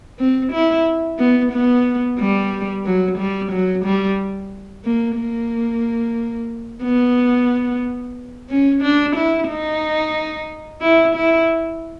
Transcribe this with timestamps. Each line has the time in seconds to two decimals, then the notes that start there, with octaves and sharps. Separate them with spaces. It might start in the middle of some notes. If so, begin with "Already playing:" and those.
0.19 C4
0.53 E4
1.19 B3
1.53 B3
2.19 G3
2.85 F#3
3.18 G3
3.52 F#3
3.85 G3
4.85 A#3
5.17 A#3
6.83 B3
8.50 C#4
8.82 D4
9.16 E4
9.49 D#4
10.81 E4
11.16 E4